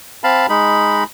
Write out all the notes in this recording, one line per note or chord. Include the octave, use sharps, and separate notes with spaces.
C4 F5 A5 B5
G#3 D#4 B5